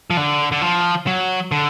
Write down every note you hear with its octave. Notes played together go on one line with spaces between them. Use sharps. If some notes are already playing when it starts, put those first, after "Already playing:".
F3
D3
D3
F3
F#3
D3